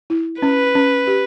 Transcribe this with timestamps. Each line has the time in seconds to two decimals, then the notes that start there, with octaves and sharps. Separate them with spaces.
0.10 E4
0.42 C#4 B4
0.75 C#4
1.07 G4